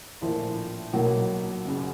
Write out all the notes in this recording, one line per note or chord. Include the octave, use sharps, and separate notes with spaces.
A#1 A2 F3 A#3
B1 B2 F#3 A#3
F#1 F#2 C#3